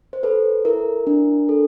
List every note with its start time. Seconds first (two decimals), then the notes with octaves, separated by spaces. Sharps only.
0.13 C5
0.23 A4 B4
0.65 E4 A#4
1.07 D4
1.49 A4